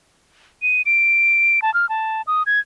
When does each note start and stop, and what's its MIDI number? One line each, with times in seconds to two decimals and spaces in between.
0.62 0.82 99
0.86 1.60 98
1.62 1.73 81
1.74 1.89 89
1.89 2.22 81
2.27 2.43 87
2.46 2.60 92